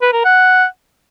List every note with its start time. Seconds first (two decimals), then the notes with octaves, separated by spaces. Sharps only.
0.02 B4
0.13 A#4
0.25 F#5